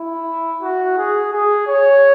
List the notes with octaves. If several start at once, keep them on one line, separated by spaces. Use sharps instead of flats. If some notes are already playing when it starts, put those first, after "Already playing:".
Already playing: E4
F#4
G#4
G#4
C#5